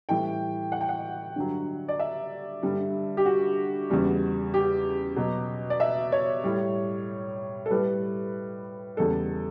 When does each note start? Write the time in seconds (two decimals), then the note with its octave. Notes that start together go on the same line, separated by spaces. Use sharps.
0.09 A2 E3 G3 G5
0.72 F#5
0.81 G5
0.89 F#5
1.36 G2 D3 F#3
1.88 D5
2.00 E5
2.63 G2 D3 G3
3.17 G4
3.26 F#4
3.90 E2 C#3 G3
4.54 G4
5.16 B2 F#3
5.70 D5
5.80 E5
6.12 C#5
6.44 A2 G3
7.66 A4
7.70 A2 G3 B4
8.97 E2 C#3 G3 A4